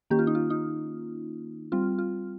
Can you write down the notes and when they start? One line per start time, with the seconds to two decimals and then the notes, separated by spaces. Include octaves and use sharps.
0.10 D#3 A#3 C#4 G4
0.19 F4
0.27 D#4
0.35 F4
0.50 D#4
1.72 G3 C4 F4
1.98 F4